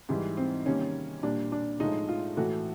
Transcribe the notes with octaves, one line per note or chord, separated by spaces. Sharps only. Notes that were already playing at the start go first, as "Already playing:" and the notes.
G#2 E3 G3
C4
C3 D#3 G3 A#3 C#4
A#2 G3 A#3 D4
D4
A2 F3 G#3 D#4
F4
A2 E3 A3 F#4